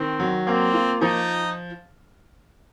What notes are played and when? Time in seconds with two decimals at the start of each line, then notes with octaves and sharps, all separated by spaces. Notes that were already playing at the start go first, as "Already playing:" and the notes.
Already playing: D#3 C4
0.20 F#3
0.47 A#3 C4
0.74 F4
1.01 F3 D#4